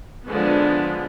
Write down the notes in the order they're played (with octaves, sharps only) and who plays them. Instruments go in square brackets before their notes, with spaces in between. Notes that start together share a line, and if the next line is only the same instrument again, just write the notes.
[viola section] D3 F3 G#3 B3